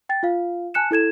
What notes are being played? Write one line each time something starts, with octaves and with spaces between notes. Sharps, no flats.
G5 A6
F4 F5
G#5 A5 F#6 C#7 E7
E4 A4 G#6 E7